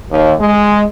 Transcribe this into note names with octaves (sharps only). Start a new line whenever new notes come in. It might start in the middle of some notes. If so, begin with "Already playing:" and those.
D#2
G#3